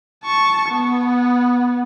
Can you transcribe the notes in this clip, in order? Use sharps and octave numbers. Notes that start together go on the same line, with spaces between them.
A5 C#6
B3